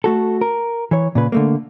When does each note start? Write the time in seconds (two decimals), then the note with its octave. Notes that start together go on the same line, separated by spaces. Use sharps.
0.04 A3 F#4 A4
0.41 A#4
0.91 E3 C#5
1.15 A#2 C#3 B4
1.32 D3 A3 A#3